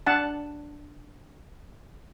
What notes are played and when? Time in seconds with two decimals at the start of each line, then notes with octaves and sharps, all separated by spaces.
0.06 D4 F#5 A5